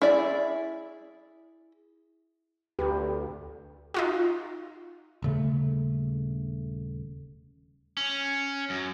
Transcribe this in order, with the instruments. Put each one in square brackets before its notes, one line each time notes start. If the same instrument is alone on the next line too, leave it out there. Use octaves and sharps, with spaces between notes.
[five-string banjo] E4 G#4 D5 E5
[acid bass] D2 [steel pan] G4 B4
[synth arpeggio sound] D#4 F4 F#4
[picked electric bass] D#1 C#3 A3
[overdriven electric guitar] C#4
F#2